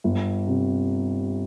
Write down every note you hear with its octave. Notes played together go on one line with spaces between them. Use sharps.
G1
C3